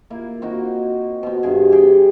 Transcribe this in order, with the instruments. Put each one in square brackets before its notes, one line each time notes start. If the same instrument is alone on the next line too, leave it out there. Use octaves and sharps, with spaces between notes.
[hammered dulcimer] A#3 E4 F4
C4 D#4 F#4
B2 C4
G2 C3 G#4
G4 G#4 G5